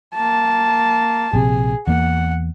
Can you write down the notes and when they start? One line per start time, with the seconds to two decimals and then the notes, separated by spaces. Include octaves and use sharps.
0.15 A#3 A5
1.33 A#1 C3 G#4
1.88 E2 A#3 F#5